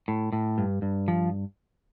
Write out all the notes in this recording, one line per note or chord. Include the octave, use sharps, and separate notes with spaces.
A2
A2
G2
G2
F3